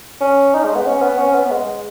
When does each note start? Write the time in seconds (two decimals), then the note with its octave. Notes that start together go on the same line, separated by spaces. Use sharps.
0.21 C#4
0.54 D#4
0.64 G#3
0.75 B3
0.86 C#4
1.02 B3
1.18 C#4
1.35 B3
1.45 B3
1.51 G#3